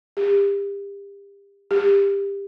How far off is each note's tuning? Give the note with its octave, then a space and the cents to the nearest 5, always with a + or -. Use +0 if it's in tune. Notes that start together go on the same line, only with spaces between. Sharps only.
G4 +35
G4 +25